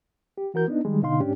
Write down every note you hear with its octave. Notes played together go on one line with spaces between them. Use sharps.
G4
E3 F#4 A#4 G6
B3 D4 D#4
D#3 G3 G#3
B2 D3 D#4 F5 C6
G#2 C#4 D4 G4